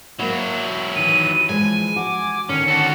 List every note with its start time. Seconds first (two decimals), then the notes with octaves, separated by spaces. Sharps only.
0.19 F#3 A#3 E4 F#4
0.96 D#3 E3 D#7
1.49 E3 F3 G#3 G#5
1.96 F#4 D6
2.49 D3 D#3 C#4 C#7
2.68 F#4 A4